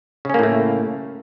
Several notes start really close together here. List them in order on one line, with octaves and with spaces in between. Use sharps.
C#3 C#4 A#3 A2 A3